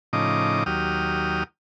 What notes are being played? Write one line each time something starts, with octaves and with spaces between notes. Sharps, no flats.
A2 C#3 F3 D#4 D#5 D6
D#2 F#3 G4 D#6 F6